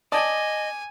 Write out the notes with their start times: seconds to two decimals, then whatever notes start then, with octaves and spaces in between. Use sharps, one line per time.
0.12 D5 D#5 G#5 A5 D#6